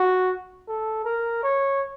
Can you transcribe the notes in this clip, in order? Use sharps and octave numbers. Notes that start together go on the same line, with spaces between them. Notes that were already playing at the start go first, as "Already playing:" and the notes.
Already playing: F#4
A4
A#4
C#5